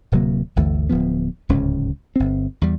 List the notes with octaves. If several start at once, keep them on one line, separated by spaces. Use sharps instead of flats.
D1 C3 F#3 A#3
G1 D2 E3 A3
D1 F3 B3
D1 C#2 G#2 C#4
G1 C4
E2 G3